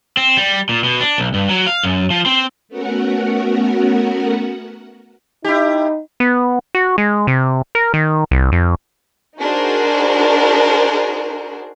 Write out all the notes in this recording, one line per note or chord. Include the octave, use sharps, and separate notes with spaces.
C4
G3
A#2
B2
D4
B1
G2
F#3
F5
F#2
F3
C4
A3 B3 C#4 F#4 A#4 F#5
D#4 E4 G4
B3
F#4
G#3
C3
A#4
D#3
C2
F2
D4 D#4 F#4 G#4 A#4 C5